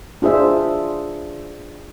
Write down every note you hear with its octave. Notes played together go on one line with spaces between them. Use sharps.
D4 F4 G#4 C5 E5